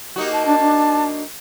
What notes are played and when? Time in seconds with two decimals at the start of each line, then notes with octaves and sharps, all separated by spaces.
0.16 A#3 D#4 F#4 G4
0.32 A5
0.46 D4 A5
0.59 D4